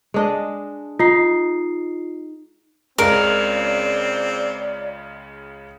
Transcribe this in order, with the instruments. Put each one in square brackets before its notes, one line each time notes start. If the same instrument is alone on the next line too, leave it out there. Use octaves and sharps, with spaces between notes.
[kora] G#3 D4 D#5
[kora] D#4 [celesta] F4 C7
[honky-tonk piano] C#2 C#3 G#3 [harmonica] C4 [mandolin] A#4 [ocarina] D5